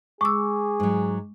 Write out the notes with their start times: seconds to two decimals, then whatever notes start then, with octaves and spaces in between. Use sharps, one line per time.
0.21 G#3 G#4 C#6 D6 E6
0.80 G#2 F#3